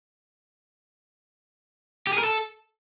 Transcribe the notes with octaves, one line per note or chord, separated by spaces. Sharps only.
G4
G#4
A#4
A4